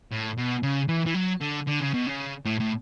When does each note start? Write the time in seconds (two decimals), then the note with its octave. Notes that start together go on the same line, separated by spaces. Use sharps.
0.11 A2
0.38 B2
0.63 C#3
0.88 E3
1.06 E3
1.14 F#3
1.41 D3
1.67 D3
1.81 C#3
1.94 B2
2.07 C#3
2.45 A2
2.60 A2